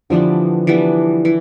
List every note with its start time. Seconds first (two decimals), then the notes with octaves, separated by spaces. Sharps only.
0.10 D3 E3 F3 G3 B3 D4
0.67 E3 G3 B3 D4
1.25 E3